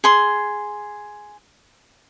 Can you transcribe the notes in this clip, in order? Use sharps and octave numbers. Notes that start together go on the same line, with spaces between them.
G#4 C6